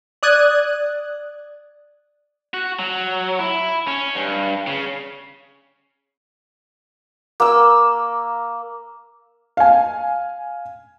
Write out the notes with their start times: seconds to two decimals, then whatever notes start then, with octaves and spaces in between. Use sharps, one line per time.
0.23 D5 D#6 F#6 G#6
2.54 F#4
2.79 F#3
3.39 E4
3.88 C#4
4.15 G2
4.67 C#3
7.40 A#3 E6
9.57 F5 G#5